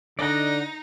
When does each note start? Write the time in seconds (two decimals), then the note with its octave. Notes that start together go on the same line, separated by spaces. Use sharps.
0.19 D3 D#4 D5 D#5 F#5